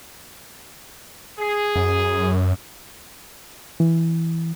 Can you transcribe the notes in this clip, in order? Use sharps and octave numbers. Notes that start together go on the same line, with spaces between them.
G#4
F#2
E3